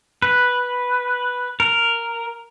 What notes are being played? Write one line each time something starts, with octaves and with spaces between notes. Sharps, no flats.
B4
A#4